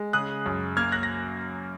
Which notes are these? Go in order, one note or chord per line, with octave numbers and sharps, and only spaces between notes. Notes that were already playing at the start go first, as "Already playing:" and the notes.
Already playing: G#3
C#3 D#6 F#6
F#2
A#3 F6 G#6
F#6 A#6
A#6